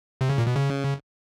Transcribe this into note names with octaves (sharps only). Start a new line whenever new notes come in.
C3
C#3
A#2
B2
C#3